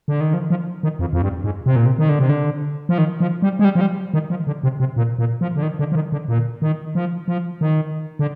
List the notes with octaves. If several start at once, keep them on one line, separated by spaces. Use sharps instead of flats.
D3
D#3
F3
F3
D#3
F2
F2
G2
G#2
C3
A#2
C3
D#3
D3
C3
D3
F3
D#3
F3
G3
G#3
G3
F3
G3
D#3
F3
D3
C3
C3
A#2
A#2
F3
D3
D#3
D3
F3
D#3
D3
A#2
D#3
F3
F3
D#3
D3